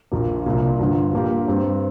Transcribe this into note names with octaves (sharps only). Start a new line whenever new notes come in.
A#1 A#2 A#3
C2 A#2 A#3
G2 D3 F3
A#2 A#3 G4
G2 G3 C4